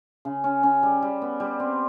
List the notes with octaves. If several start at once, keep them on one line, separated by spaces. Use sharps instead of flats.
C#3
C#4
C#4
G3
G3
B3
G3
C4